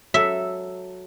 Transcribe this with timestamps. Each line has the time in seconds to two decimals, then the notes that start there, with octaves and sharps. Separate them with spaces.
0.14 F#3 A4 E5